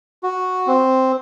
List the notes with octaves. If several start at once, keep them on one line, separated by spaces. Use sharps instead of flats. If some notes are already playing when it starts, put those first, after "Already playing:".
F#4
C4